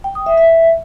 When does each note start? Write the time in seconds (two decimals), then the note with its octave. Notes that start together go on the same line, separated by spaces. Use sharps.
0.04 G5
0.15 D#6
0.26 E5
0.37 E5